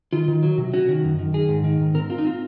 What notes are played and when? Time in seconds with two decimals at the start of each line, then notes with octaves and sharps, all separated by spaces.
0.13 D#3 F4
0.28 D#3
0.43 F#3
0.58 C3
0.73 C#4 F#4
0.89 D#3
1.04 F#2
1.19 D#3
1.34 D#3 G#4
1.49 G#2
1.64 D#3
1.80 G#2
1.94 C4 A#4
2.10 C4 F4
2.18 D#4
2.24 C4 F4